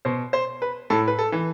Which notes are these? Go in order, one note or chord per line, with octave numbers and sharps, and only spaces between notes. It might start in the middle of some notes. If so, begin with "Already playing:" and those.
B2 C5
C5
B4
A2 A4
B4
A4
E3